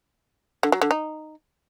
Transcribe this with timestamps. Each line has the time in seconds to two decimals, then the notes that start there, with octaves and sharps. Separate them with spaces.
0.63 D3
0.72 F#3
0.82 D3
0.91 D#4